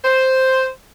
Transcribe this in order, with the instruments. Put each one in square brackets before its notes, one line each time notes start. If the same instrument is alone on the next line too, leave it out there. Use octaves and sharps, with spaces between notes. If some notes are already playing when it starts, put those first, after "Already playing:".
[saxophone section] C5